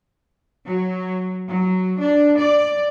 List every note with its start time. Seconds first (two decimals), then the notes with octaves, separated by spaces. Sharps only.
0.67 F#3
1.49 F#3
1.98 D4
2.40 D5